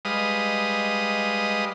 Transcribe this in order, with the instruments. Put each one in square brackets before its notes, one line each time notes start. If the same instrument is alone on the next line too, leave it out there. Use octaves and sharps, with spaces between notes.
[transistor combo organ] G3 G#3 B4 D#5 F5 D#6